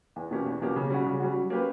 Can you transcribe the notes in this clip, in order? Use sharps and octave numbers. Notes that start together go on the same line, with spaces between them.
E2
B2 A#3 C#4 G4
E2
B2 A#3 C#4 G4
C#3
G3 C#4 F#4
C#3
G3 C#4 F#4
F#3
A#3 C#4 G4 B4